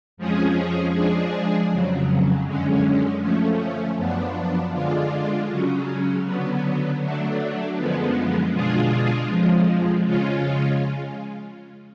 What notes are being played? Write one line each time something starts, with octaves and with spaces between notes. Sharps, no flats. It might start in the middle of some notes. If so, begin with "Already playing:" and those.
F2 F3 G#3 C#4 G#4
F3 G#3 D4 G#4
F2 C#3 F#3
F#2 D3 G#3 C#4
F3 A3 C#4
F#2 F3 B3 D4
D3 G#3 D4 F4
C#3 F#3 C#4
D3 F#3 B3
F#3 A3 D4
F#2 D3 F3 G#3 B3
B2 G#3 D4 F4 G#4
F2 F3 G#3
C#3 G#3 C#4 F4